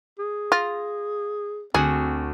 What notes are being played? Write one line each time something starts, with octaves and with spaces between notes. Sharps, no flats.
G#4
F4 A#6
D2 C4 F#4 G#4